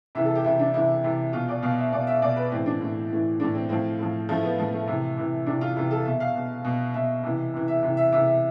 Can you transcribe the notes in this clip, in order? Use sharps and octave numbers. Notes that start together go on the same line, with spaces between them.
C3 E3 E5
A4
G4
C3 E3 E4
D4
C3 E3 E4
C3 E3
B2 F4
D5
B2 F5
E5
B2 D5
E5
B2 D5
B4
A2 E3 C4
D4
A2 E3
A2 E3
A2 E3 D4
C4
A2 F3 C4
A2 F3
A2 F3 A3
B3
A2 F3
A3
C3 E3
C3 E3
C3 E3 D4
F4
C3 E3 G4
A4
B2 E5
F5
B2
B2
B2 E5
C3 E3
C3 E3
E5
C3 E3
E5
C3 E3 E5
E5